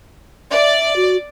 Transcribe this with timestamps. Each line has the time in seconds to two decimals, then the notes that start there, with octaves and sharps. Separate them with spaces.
0.51 D5 E5
0.96 F#4